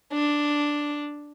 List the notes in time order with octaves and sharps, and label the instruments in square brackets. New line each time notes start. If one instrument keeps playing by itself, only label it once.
[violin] D4